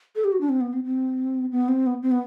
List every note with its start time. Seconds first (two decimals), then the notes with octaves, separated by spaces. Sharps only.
0.15 A4
0.24 G4
0.32 F#4
0.41 D4
0.49 C4
0.61 B3
0.73 C4
0.84 C4
1.52 B3
1.68 C4
1.86 B3
2.02 C4
2.11 B3